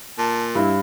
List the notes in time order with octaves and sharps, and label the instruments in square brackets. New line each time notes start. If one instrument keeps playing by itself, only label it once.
[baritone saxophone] A#2 [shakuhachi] A5
[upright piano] G2 [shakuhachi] E4